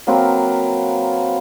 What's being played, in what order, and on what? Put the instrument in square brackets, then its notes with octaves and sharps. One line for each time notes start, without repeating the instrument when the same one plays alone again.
[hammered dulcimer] F#3 A#3 C4 B4